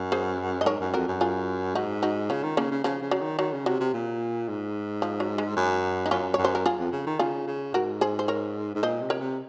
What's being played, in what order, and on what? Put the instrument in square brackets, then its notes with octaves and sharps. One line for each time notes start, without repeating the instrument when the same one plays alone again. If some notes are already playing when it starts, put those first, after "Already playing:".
Already playing: [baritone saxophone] F#2
[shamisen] G#4 C5
D#5
[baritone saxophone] G#2 [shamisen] A#4 C#5
[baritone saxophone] F#2
[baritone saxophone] F2 [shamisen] F#4 A#4
[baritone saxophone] F#2
[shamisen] F4 G#4
[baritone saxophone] G#2 [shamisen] D#4 F#4
[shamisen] D#4 F#4
[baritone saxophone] C#3 [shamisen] C#4 F4
[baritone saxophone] D#3
[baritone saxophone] C#3 [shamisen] A#3 C#4
[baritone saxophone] C#3
[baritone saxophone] C#3 [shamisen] F3
[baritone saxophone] C#3
[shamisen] F#3
[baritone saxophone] D#3
[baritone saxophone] D#3 [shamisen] F#3
[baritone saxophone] C#3
[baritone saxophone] C3 [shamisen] F#3
[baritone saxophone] C3
A#2
G#2
[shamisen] F3
F#3
G#3
[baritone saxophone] F#2
[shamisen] D#4
[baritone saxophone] F#2 [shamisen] C#4 F4
[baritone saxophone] F#2 [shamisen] C#5
[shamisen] C5
A#4
F4 G#4
[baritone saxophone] F2
C#3
D#3
[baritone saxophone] C#3 [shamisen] F4 G#4
[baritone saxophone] C#3
[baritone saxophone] G#2 [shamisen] F#4 A#4
[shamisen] G#4 C5
C5
A#4 C#5
[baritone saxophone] G#2
[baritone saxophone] A#2 [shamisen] C5 D#5
[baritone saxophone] C3
[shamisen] A#4 C#5
[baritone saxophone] C3